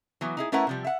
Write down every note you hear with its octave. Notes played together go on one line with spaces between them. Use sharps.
E3 F#3 B3
D#4 E4 G#4
A3 C#4 E4 A#4 B4 F#5
C3 F3 G3
E5 F#5